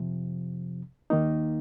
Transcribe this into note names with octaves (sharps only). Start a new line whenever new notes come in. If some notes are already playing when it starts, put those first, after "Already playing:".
Already playing: F2 C3 F3
D#2 D#3 A#3 D#4